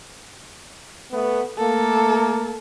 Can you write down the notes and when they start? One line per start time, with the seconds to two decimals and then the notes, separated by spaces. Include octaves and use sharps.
1.12 A3 B3
1.58 A3 A#3 A4